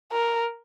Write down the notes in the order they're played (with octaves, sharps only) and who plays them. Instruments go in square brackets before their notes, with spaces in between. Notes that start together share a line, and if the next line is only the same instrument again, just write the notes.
[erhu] A#4